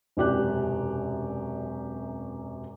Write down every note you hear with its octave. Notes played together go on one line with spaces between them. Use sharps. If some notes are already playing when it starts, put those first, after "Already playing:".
E1 F#2 C3 G4 D5 F#6